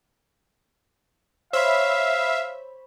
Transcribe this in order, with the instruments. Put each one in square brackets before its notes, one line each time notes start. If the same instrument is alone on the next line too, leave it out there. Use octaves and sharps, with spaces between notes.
[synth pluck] C5 C#5 B5 [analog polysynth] E5 [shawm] F5